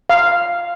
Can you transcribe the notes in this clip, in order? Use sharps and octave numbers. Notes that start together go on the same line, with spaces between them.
F5